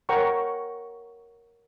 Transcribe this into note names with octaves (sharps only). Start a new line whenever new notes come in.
A#4 C#5 F#5 G5 A#5 C#6